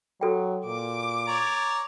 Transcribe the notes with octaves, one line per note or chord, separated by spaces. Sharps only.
F#3 F#4 A4 G5
A#2 D6
C#5 D5 A#5